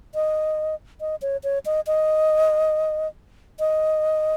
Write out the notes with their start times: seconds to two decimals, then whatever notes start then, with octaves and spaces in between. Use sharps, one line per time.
0.15 D#5
1.01 D#5
1.22 C#5
1.44 C#5
1.66 D#5
1.87 D#5
3.59 D#5